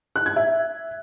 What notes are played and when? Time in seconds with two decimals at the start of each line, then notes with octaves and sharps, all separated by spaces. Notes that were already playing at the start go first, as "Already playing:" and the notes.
0.16 F#6
0.26 G#6
0.36 E5